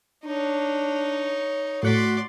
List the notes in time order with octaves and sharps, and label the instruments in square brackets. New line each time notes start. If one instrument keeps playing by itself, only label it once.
[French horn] D4 [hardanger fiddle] D#4 C#5
[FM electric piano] A2 F#5 B6 [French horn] F#4 [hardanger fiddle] D5 C6